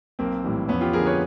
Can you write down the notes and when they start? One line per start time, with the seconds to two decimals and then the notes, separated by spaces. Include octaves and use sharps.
0.19 B1 A#3 C4
0.44 A2 E3 G3
0.68 F2 B3 C#4
0.81 F4 G4
0.93 D3 F3 G#4 A#4
1.06 B4 C#5